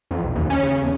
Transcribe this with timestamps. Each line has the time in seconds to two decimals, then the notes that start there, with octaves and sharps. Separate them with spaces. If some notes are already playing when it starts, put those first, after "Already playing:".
0.11 F2
0.22 B1
0.35 D#2
0.50 C#4
0.63 C#3
0.82 E2